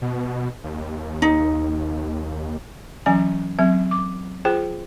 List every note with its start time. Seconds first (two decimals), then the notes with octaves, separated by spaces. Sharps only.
0.02 B2
0.64 D#2
1.22 D#4
3.06 E3 F#3 C#4 G#5
3.59 F#3 C4 E5
3.91 D6
4.45 F4 G#4 C5 G5